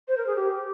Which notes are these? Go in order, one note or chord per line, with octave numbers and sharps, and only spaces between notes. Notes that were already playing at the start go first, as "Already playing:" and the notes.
C5
A#4
G#4
G4